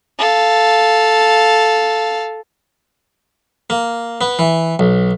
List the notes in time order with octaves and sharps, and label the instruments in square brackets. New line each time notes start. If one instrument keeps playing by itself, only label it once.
[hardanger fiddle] A4 F5
[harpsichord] A#3
B3
E3
B1